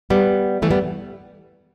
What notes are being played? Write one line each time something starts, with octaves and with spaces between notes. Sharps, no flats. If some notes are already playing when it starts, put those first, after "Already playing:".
G3 B3
E3 A3
G3 B3